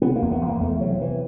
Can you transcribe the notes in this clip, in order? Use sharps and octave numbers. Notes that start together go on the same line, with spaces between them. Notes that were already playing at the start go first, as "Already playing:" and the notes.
C3 B3
A#3
E2
B3
E2
A#3
E2 A3
C3 F#3
C3 E3